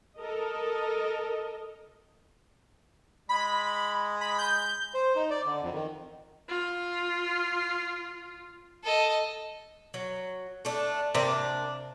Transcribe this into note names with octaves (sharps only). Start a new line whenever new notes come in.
A4 A#4 D#5
G#3 B5
B5
G6
C5
D#4
D5
D3
F2
D#3
F4
A4 D#5
F#3
A3 D4
C3 A#3 C4 D4